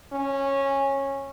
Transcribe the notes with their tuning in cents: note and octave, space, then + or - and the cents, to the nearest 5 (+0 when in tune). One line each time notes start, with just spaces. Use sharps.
C#4 -15